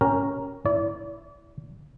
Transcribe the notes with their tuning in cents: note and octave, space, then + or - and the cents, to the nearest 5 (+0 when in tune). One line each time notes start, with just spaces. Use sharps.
C#4 +0 G4 +0 A#4 +0
E4 +0 D5 -35